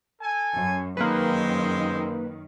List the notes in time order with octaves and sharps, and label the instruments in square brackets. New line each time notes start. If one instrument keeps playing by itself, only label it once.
[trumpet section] A4 G#5
[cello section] F#2
[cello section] F#2 D#3 [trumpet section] G#3 C4 C5 [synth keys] A#3 B4